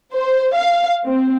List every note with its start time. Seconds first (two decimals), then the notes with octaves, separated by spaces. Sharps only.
0.13 C5
0.55 F5
1.07 C4